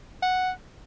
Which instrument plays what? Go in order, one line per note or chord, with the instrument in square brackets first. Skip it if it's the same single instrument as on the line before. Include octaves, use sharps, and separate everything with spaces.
[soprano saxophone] F#5